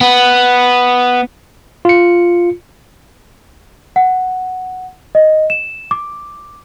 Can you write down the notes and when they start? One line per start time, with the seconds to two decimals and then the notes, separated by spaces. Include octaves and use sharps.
0.01 B3
1.85 F4 C#7
3.96 F#5
5.15 D#5
5.50 E7
5.91 D6